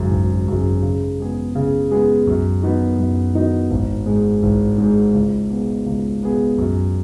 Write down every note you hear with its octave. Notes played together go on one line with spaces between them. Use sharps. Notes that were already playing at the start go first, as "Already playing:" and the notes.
Already playing: G#1 F#2 C#3 G#3
G#1
F#2 C#3 G#3
C#3
G#3 B3 G#4
C#3
G#3 B3 G#4
F#2
D#3 B3 D#4 F#4
F#2
D#3 B3 D#4 F#4
G#1
G#2 G#3
G#1
G#2
G#3
C#2
B2 B3 G#4
C#2
B2 B3 G#4
F#2